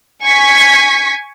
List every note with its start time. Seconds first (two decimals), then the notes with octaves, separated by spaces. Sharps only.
0.25 G#5 C#6 G#6 B6